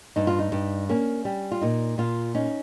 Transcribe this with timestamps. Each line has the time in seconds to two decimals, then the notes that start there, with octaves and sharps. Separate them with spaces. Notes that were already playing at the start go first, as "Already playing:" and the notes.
0.16 G2 D#4
0.27 F4
0.39 D#4
0.52 G2
0.89 A#3 C#4
1.25 G3
1.52 F4
1.61 A#2 D#4
1.98 A#2 F4
2.35 C#4 D#4